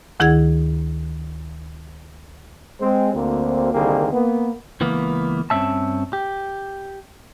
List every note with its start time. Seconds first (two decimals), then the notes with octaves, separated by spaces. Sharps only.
0.20 D2 D#3 E4 G#4 F#5 G#6
2.81 G#3 C4
3.14 D2 A#3 C4
3.74 C2 D3 D#3 A#3 G4 G#4
4.13 A#3 B3
4.81 C#2 E3 A#3 B3
5.50 G2 C4 C#4 E5 A5
6.13 G4